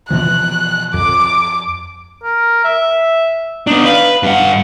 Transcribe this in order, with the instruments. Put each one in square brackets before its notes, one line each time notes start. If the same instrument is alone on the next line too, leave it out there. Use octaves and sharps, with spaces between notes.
[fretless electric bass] B2 E3 F3 [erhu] F#6
[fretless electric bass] F2 [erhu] D6
[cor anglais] A#4
E5
[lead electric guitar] B3 D4 [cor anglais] D#4
[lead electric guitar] B4 [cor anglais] F5
[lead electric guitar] G2 F#5 [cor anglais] F5